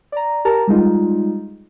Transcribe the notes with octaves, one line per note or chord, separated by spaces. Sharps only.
D5 A#5
G4 A#4 A5 A#5
G3 G#3 D#4 F4